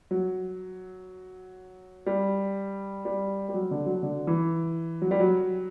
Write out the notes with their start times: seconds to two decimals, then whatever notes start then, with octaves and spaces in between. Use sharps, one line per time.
0.11 F#3
2.06 G3
3.05 G3
3.49 G3
3.54 F#3
3.71 D3
3.86 F#3
4.03 D3
4.27 E3
5.02 F#3
5.11 G3
5.20 F#3